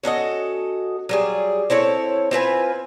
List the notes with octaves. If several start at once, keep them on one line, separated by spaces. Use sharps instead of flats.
C#4 F#4 A4 D#5
F#3 G3 G#4
C4 E4 A4 C#5
C4 F4 B4 G#5